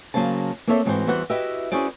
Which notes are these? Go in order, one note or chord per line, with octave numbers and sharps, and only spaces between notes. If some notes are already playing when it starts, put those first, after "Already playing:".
C#3 F#3 A#3 C5 A5
A#3 C4 A4 C#5 D5 E5
G#2 E3 C4 F#4 C5
E2 E3 G3 F#4 C5 F#5
E4 F#4 G4 B4 D#5 E5
C#4 E4 F#4 G#4 C5 D5